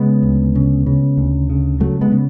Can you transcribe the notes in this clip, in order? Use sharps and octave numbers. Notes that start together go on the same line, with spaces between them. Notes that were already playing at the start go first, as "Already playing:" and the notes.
Already playing: C#3 G#3 B3
D2
C#3
C#3
D2
C#3
C#3 F#3 A3
G#3 B3
C#3